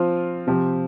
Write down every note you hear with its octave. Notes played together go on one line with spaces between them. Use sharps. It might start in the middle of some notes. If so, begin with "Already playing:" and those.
Already playing: F3 C4 F4
C3 F3 C4 G4